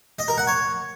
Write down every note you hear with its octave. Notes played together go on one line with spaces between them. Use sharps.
D#5
A#4
F#5
C#5